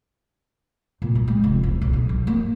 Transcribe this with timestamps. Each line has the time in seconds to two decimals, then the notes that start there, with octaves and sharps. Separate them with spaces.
1.02 A#2
1.15 F#3
1.28 G#3
1.44 F1
1.63 E2
1.81 B1
1.93 B1
2.09 F#3
2.27 A#3